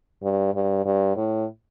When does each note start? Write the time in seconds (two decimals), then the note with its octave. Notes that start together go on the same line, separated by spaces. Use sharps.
0.23 G2
0.54 G2
0.85 G2
1.17 A2